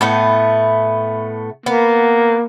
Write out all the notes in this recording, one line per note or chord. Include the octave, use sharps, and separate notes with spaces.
A2 A3 B3
A#3 B3